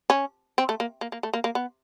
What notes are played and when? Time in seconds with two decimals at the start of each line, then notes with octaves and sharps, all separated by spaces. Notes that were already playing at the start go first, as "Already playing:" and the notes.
0.10 C#4
0.58 C4
0.69 A3
0.80 A#3
1.01 A#3
1.12 A#3
1.23 A3
1.34 A#3
1.44 A#3
1.55 B3